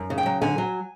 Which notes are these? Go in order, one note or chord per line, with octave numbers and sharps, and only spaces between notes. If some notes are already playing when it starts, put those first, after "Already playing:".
Already playing: F#2
C#3
G5
F#3
D3 G#5
F#3